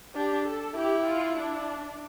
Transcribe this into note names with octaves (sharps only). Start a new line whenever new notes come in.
D4 G4
A4
E4 G4
F4
D4